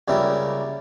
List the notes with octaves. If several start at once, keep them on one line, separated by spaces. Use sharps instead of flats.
C#2 C#3 G3 A#3 E4